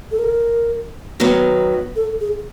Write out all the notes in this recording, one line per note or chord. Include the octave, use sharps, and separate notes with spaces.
A4
A#4
D#3 F#3 B3
A4
G#4